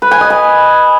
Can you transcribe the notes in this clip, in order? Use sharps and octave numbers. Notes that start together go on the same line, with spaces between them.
B4
G#5
D#5
B5